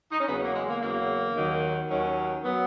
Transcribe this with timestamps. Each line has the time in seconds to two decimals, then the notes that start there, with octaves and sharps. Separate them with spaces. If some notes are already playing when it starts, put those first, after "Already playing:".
0.12 D#4
0.20 C#4
0.27 E2 C#3 F#3 B3
0.42 A#3
0.54 G#3
0.69 A#3
0.81 E2 C#3 F#3 A#3
1.35 D#2 D#3 F#3
1.90 D#2 D#3 F#3 C#4
2.44 F#3 B3